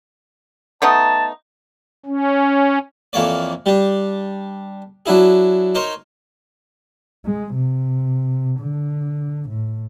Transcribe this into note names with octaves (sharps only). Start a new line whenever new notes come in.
A3 B3 D#4 A5
C#4
F2 E3 A#3 C#5 D5
G3 D4
F#3 D4 E4 G#4
D#4 A#4 C5 C#5
G#3
C3
D3
A2